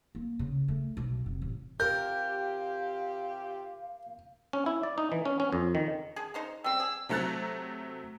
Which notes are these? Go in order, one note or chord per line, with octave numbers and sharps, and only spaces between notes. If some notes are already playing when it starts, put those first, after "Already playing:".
A#3
C#3
A3
B1
F1
A1
C3 F4 G4 A#4 F5 G6
C#4
E4
D5
D#4
E3
C#4
C#4
F2
D#3
G#4
D#4 C5 A#5
G3 C4 E6
G#4
C3 F#3 A3 A#5 F#6 A6